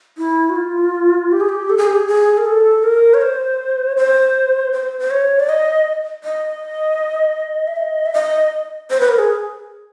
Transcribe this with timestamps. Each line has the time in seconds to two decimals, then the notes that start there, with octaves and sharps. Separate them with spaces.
0.18 E4
0.50 F#4
0.56 F4
1.32 G4
1.40 G#4
1.49 G4
1.70 A4
1.78 G#4
1.87 G4
1.95 G#4
2.08 G#4
2.38 A#4
2.46 A4
2.83 A#4
3.14 C#5
3.22 C5
3.97 C5
4.73 C5
4.99 C5
5.11 C#5
5.40 D5
5.49 D#5
6.24 D#5
7.67 E5
7.76 D#5
8.06 E5
8.14 D#5
8.90 C5
9.00 B4
9.09 A#4
9.19 G#4